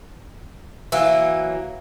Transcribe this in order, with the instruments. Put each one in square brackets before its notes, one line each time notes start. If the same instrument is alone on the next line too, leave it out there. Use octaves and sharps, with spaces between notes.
[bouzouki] E3 F#3 A#3